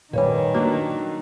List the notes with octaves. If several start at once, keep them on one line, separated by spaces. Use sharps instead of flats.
A#2 D#3 G3 B4 C#5 G#5
F#3 A#3 D4